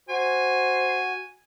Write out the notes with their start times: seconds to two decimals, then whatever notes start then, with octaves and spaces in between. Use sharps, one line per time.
0.09 F#4 C5 G#5